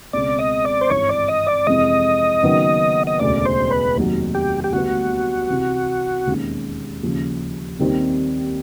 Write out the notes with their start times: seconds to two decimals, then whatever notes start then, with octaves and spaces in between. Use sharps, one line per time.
0.13 C#2 B2 G#3 C4 D5
0.39 D#5
0.65 D5
0.81 C5
0.90 G#1 G2 E3 C#5
1.09 D5
1.28 D#5
1.47 D5
1.67 F2 C3 E3 G#3 D#5
2.43 F#1 F#2 D#3 F#3 B3
3.07 D#5
3.19 E1 D2 C#3 D5
3.45 C5
3.71 B4
3.96 F1 D#2 D#3 F#3
4.35 G4
4.64 G4
4.73 D2 D3 G3 B3 F#4
5.50 C2 C3 E3
6.26 E1 D#2 D#3 G#3 C#4
7.03 D#2 C#3 F3
7.79 D#2 D#3 G3 C4